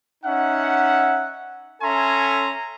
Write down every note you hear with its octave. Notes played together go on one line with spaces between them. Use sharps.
C#4 D#4 E5 F#5
C#4 A4 E5 G#5 A#5 C6